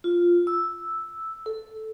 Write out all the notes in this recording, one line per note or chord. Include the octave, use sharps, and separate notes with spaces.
F4
E6
A4